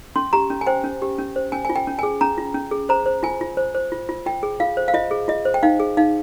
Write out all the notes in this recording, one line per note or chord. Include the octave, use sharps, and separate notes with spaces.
C#4 C6
G4 A#5
C#4
G#5
C5 G5
C#4
G4
C#4
C5
C#4 G#5
F4 G#5
G5
C#4
G#4 G#5
C#4 A#5
F4
C#4
G#4
C5 A#5
C5
F4 G#5
F4
C5
C5
F4
F4
F4 G5
G#4
F4 F5
C5
F5
F4 D#5
G#4
F4 D#5
C5
G5
D#4 F5
G#4
D#4 F5